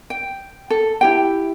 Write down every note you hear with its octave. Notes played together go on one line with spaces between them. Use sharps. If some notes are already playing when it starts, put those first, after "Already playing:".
G5
A4
E4 G4 G5